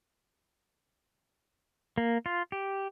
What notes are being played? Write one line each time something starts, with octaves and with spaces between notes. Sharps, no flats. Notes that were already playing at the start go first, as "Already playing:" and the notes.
A#3
F4
G4